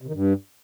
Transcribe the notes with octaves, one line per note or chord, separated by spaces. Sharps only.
C3
D#3
G2